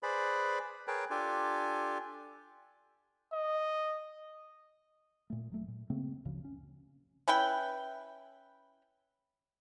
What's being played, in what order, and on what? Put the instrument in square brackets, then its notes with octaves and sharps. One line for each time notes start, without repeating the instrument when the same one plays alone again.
[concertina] G#4 B4 C5 D5 B5
G#4 A#4 B4 C#5 G5 A5
D4 F4 G4 A4 G#5
[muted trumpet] D#5
[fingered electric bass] A#2 A3
F1 F#3 A3
A#2
C#3 A3 A#3 C4
F#1 D2 C#3 F3
C#4
[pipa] C#4 E4 B4 G5